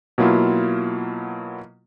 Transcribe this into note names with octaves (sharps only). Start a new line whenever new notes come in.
B2 F#3 A#3 E4 F4